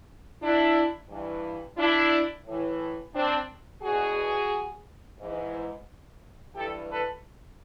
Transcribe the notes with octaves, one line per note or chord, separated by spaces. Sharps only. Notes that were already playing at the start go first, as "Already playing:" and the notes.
D4 E4
G2 E3
D4 E4
A2 E3
C4 D4
E2 B2 F#4 G#4
G#2 E3
G2 E3 G4 A4
A4 B4